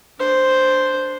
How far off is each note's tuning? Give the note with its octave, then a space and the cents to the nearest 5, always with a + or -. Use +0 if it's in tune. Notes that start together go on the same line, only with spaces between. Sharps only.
D4 +0 C5 +0